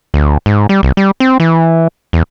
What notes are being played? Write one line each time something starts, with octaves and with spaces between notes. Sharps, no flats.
D2
G#2
G3
C2
G3
C4
E3
E2